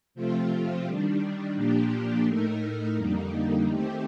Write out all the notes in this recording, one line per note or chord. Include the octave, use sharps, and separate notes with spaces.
C3 F3 A3 C4 F4
D#3 G3 D4
A#2 F3 A#3 D4 G4
A2 A3 D#4 A#4
F2 D3 G3 A#3 D#4
D#3 A3 C4 G4